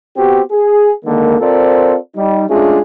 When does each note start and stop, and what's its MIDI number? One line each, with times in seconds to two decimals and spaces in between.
0.17 0.42 59
0.17 0.42 60
0.17 0.42 66
0.17 0.42 67
0.51 0.92 68
1.05 1.35 50
1.05 1.35 51
1.05 1.35 56
1.05 1.35 58
1.40 1.97 60
1.40 1.97 65
1.40 1.97 69
1.40 1.97 70
1.40 1.97 72
1.40 1.97 74
2.16 2.45 55
2.16 2.45 63
2.49 2.80 56
2.49 2.80 57
2.49 2.80 61
2.49 2.80 62
2.49 2.80 65
2.49 2.80 68